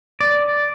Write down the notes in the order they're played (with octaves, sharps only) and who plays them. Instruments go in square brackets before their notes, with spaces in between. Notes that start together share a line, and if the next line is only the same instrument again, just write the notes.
[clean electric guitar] D5